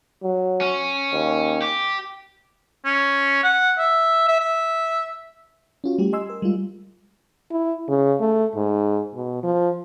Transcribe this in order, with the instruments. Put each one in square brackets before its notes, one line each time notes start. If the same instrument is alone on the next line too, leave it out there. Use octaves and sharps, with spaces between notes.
[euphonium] F#3
[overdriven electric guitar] C#4
[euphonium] D#2
[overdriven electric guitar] G4
[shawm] C#4
F#5
E5
E5
E5
[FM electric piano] C#4 F4 F#4
G3 A3 G4
D#5 G#5 C6 E6
A#4
G3 G#3 F4
[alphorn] E4
C#3
A3
G#2
B2
F3